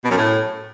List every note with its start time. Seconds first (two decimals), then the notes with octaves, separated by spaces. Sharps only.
0.03 B2
0.10 F#2
0.17 A2